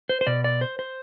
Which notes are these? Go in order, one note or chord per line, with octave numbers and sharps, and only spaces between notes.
C5
C5
B2 D5
D5
C5
C5